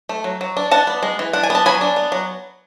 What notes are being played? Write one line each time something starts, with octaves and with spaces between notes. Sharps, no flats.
A3
F#3
F#3
D4
D4 F#5 A5
B3
G#3
E3
D4 F#5
G#5
B3 A5
F#3 G#5 B5
D4
B3
F#3